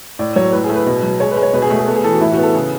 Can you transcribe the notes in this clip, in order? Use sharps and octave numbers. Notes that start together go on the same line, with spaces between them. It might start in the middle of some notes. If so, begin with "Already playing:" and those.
A2 D5
F#3 C#5
A2 B4
G#4
A3
B4
B2
F#3
G#3 C#5
B4
G#3
C#5
B2 B4
G#4
A3 F#4
G#4
B3 A4
G#4
E3 A4
F#4
A2 E4
F#4
B3
A4
C#3 G#4